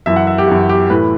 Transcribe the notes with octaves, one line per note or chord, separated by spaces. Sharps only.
F#2 E3 E5
F#5
E5
G4
F#2 E3 F#4
G4
A2 E3 B4